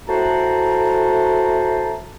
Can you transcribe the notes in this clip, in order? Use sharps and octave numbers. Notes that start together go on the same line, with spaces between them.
A2 A3 F#4 C5 A5 A#5